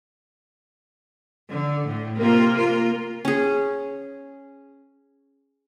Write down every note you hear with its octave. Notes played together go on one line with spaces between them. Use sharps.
D3
A2
C3 A#3 F4 A#4
F4
C#4 G#4